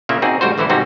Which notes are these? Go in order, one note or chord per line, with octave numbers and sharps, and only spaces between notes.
A#2 C#3 A#3 E5
C4 D#4 F#4 G#4 D5
C#2 A2 G3 F#4 C5
A1 D3 E3 E4 C5
G#2 C3 C4 C#4 D#4 F#4